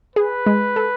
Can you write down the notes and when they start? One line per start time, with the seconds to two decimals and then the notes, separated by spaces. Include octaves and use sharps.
0.16 G#4 B4
0.46 G#3
0.76 A4